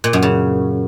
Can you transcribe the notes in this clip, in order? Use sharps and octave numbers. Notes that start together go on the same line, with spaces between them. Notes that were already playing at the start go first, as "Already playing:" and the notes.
A#2
F#2
C#3